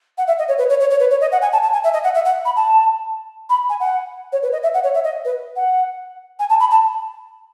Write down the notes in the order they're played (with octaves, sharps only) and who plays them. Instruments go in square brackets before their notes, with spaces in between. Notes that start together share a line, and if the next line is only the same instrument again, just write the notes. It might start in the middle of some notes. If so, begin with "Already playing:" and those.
[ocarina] F#5
E5
D#5
C#5
B4
C#5
C#5
C#5
B4
C#5
D#5
F#5
G#5
A5
A5
G#5
E5
D#5
F#5
E5
F#5
B5
A5
B5
G#5
F#5
C#5
B4
D#5
E5
F#5
C#5
E5
D#5
B4
F#5
G#5
A5
B5
A5